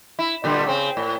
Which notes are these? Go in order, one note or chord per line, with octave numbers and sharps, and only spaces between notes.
E4
A#2 D3 G3
C#3 C4
A2